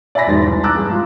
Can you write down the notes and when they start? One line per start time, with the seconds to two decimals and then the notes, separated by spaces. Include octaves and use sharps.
0.15 D5 E5 G#5 B5 A#6 B6
0.27 E1 G#2 D#3 G#3 A6
0.47 C2
0.63 A5 A#5 D6 E6 F#6 A6
0.75 G2 G#4
0.90 G#3 F4